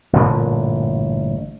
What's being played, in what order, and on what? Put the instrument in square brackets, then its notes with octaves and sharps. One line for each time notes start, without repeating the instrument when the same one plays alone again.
[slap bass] A1 G2 A#2 D3